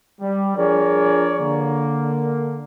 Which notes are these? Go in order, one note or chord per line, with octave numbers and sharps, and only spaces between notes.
G3
F3 D4 G#4 A#4 C#5 D5
D3 A#3